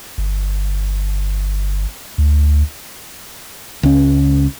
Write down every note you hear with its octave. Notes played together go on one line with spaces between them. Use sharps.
G1
D2
C#2 C#4